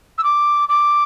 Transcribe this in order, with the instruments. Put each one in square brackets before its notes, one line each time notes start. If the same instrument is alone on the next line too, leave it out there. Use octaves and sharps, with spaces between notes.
[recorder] E6
D6
D6